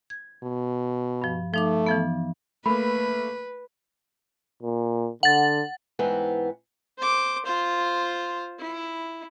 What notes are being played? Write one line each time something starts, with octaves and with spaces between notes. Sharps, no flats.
G#6
B2
G2 F3
F3 A3 D#4 D6
E3 F3 B3
A3 A#3 A#4 B4 B5
A#2
D3 F#5 A6
G#2 E3 B3 C4
C5 D6
F4 C5
E4